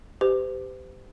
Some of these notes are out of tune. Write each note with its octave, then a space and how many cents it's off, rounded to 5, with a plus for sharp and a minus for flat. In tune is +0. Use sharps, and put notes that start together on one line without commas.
G4 +0 C5 -45